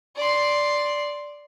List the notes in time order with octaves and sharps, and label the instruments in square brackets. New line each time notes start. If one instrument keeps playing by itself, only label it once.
[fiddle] D5 C6